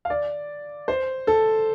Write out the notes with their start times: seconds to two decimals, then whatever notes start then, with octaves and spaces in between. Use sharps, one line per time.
0.05 F5
0.10 D5
0.88 C5
1.27 A4